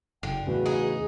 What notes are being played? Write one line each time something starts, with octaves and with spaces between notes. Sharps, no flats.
F#1 D3 G5
E2 A2 C#3 F#4 B4
D#4 G#4